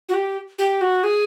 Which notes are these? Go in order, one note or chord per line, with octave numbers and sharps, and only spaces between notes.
F#4
G4
G4
F#4
G#4